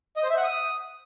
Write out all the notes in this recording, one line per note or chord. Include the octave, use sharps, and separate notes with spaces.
D#5
C5
E5
F#5
D#6